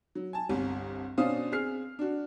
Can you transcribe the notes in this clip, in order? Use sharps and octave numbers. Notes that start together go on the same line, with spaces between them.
F#3
G#5 A5
G1 C2 C3
B2 C#4 D4 C5 F5 D#6
C4 G#4 F6 C7
D4 F#4